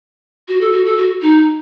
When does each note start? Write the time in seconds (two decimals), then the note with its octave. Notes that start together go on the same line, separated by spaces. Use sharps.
0.48 F#4
0.61 A4
0.72 F#4
0.85 A4
0.97 F#4
1.21 D#4